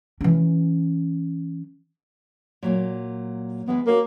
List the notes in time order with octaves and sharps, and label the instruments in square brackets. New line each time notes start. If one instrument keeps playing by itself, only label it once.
[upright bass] E3 C#4
[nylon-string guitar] A#2 F#3 A#3
[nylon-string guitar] E3 G#3 B4 [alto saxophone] B3
[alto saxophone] A#3 [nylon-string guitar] C#4 F#4